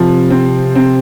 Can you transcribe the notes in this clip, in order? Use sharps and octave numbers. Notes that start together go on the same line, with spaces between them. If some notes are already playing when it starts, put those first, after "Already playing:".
Already playing: C3 F3
C4
C4